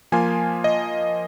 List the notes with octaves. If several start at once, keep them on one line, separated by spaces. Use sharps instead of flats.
F3 A#3 F4 G#5
D#5